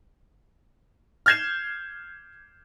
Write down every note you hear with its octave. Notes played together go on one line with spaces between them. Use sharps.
F6 G6 G#6 C7 E7